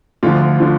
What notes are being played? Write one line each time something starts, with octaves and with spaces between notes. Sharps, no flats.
D2 D3 F3 F4
D3 F3